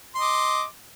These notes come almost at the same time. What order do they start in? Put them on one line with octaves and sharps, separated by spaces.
C6 D#5 D6